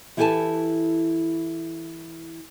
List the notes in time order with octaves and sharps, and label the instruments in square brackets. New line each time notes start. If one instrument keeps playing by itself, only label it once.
[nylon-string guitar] E3 E4 G4 A4 G#5 A5